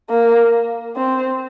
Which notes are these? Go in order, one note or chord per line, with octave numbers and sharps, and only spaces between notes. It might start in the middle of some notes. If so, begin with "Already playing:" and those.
A#3
C4